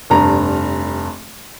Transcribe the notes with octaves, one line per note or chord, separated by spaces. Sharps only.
F1 G2 A#5